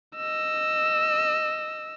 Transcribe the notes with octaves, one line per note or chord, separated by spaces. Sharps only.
D#5 E6